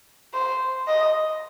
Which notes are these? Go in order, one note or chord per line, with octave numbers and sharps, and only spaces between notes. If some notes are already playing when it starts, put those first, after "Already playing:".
C5
D#5